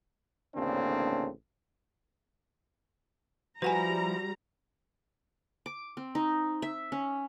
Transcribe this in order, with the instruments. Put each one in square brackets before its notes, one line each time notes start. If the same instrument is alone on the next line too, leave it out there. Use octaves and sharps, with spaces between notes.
[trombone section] A1 D2 C#3 A#3 C4 D4
[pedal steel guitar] F3 E4 [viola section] G3 A#5 [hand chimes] F#4 [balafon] B4 F#5 G#5
[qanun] D6
C4
D#4
E5
C#4